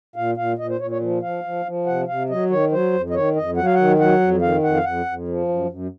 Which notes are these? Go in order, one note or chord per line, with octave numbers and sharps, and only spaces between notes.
A#2 F5
A#2 F5
A#2 D#5
C5
A#2 C#5
C#5
F3
F3 F5
F3
F3
C3 F#5
C3 F5
F#3 D#5
D#3 C#5
F#3 C5
F2
D#5
D#3 C#5
F2 D#5
F#3 F#5
F5
D#3 F#5
F#3 F#5
F2
D#3 F5
F2 F#5
F5
F2 F#5
F2
F3
F#2
F#2